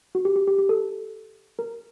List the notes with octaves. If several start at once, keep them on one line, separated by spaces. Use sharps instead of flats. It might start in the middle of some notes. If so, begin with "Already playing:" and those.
F#4
G4
G4
G4
G4
A4
A#4